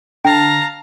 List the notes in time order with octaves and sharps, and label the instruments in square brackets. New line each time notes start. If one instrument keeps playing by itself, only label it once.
[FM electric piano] D3 [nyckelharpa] F5 A5 [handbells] G5 [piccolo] A#5